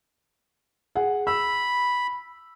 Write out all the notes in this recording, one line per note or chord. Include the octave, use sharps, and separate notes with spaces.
G#4 F#5
B5 E6